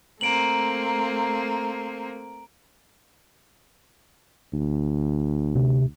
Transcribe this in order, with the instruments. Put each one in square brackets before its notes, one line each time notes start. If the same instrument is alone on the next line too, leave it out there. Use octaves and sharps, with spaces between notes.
[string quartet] A3 A#3 C4 [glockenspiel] A#5 D7 F#7
[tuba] D2
[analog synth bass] C3